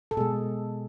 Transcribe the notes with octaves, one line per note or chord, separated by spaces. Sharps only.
A4
B2 G#3 G#4